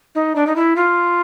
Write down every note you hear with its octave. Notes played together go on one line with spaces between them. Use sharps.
D#4
D4
D#4
E4
F4